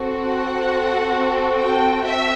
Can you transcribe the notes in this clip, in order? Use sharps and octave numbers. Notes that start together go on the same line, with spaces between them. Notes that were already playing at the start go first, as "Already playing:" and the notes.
Already playing: C4 F#4 A4
F#5
G5
E5